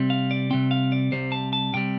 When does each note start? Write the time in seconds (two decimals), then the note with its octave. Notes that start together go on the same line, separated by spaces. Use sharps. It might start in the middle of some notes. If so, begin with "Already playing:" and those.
Already playing: C3 G3 C4
0.10 F5
0.31 D5
0.50 C3 G3 C4 G5
0.71 F5
0.92 D5
1.12 C2 C3 G3 C5
1.32 A5
1.53 A5
1.73 C2 C3 G3 G5